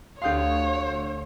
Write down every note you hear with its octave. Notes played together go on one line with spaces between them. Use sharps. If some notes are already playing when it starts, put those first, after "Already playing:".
D2 D3 G4 C#5 F5 C6 D#6 G6